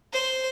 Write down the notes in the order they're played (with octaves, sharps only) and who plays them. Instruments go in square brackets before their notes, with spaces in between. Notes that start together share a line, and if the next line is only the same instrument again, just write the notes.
[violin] C5